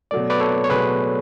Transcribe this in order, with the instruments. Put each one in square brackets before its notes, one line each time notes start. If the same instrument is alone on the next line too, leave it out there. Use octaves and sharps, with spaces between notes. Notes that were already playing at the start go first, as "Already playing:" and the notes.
[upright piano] B2 F#3 A3 [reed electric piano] D5
[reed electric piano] B4 D5
A4 C#5
C#5
[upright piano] B2 F#3 A3 [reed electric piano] G#4 B4